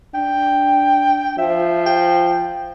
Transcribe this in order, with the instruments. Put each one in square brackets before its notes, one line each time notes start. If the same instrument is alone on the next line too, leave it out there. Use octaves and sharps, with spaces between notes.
[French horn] D4 [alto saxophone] G5
[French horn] F3 [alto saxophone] E5
[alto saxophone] G5